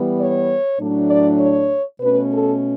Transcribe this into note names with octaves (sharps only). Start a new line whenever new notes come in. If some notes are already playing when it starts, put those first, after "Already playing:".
Already playing: E3 G3 B3
C#5
A2 F#3 A3 D4
D5
C#5
B2 A3 C#4 B4
A4